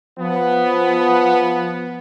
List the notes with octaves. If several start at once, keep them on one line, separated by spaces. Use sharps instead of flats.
F3 B3